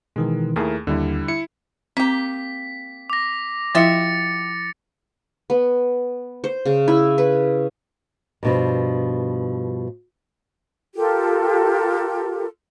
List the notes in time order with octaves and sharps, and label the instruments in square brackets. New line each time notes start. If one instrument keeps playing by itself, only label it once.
[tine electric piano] B2 D#3 E3 [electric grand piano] G#3
[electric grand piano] D#2 A3 G#4 [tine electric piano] E4 A#4
[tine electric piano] D#2 [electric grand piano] D3 G3 E4
[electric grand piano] E4 [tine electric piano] C#7
[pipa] A#3 G4 [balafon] C4 [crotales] B6
[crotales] D6 A#6
[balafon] F3 E4 [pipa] F4 G4 E5 [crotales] A6 C#7
[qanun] B3
C5
C#3
E4
B4
[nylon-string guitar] G2 B2 F3
[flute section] F4 G4 A4 A#4